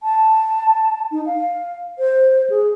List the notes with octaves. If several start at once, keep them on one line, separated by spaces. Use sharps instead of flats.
A5
D#4
F5
C5
G#4